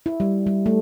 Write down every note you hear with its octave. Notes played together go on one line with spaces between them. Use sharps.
E4
G3
G3
A3